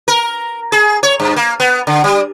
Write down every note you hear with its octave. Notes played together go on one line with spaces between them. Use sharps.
A#4
G#4
C#5
G2
A#3
B3
D3
G3